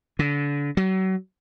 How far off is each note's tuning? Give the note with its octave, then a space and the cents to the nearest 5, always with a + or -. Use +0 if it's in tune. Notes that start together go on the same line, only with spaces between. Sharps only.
D3 -30
F#3 +35